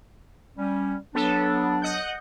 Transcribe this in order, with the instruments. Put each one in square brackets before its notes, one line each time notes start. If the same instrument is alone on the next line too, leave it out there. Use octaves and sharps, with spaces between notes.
[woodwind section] G3 C#4
[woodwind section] F#3 D4 [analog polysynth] B3 A4
[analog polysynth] D#5 F#5 G6